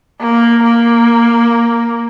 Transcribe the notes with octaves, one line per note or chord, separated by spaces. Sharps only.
A#3
A#3